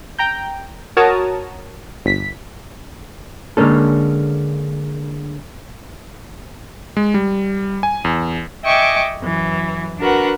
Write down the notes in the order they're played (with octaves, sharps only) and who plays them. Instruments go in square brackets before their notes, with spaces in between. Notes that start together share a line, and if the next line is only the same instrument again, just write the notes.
[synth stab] G5 A#5 G6
F#4 A#4 C#5 A5 A#5 D#6
G1 B6
[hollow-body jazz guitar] D3 G#3 A#3 C#4 A4
[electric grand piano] G#3
G3
G#5
E2
[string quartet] D#5 E5 G5 G#5 C#6 D6
F#2 E3
D4 F#4 A#4 B4 F#5